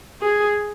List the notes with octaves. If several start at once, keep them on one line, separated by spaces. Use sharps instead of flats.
G#4